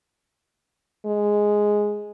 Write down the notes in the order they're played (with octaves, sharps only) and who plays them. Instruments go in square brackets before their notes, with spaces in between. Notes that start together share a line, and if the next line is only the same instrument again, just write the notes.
[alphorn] G#3